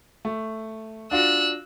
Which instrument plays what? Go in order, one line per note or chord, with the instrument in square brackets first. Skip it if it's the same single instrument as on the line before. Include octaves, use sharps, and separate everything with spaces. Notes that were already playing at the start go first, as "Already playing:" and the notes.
[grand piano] A3
[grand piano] D4 F4 F#4 [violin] E6 F#6